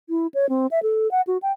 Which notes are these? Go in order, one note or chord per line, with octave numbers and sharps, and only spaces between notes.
E4
C#5
C4
E5
A4
F#5
F#4
G5